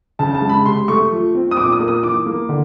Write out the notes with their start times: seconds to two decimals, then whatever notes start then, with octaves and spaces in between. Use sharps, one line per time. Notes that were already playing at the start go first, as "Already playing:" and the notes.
0.19 C#3 A5
0.34 A5
0.42 G#3
0.49 B5
0.65 C3 C6
0.88 A3 C#6
1.11 F3
1.35 C4
1.51 D#6
1.57 A#2 D6
1.72 D#6
1.80 A#3
1.88 D#6
2.03 E3 D6
2.26 A#3
2.49 D3